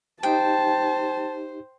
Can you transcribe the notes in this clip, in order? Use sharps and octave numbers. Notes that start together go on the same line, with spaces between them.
D#4 G4 C5 G5 A5